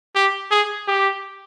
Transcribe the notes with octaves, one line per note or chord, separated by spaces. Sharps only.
G4
G#4
G4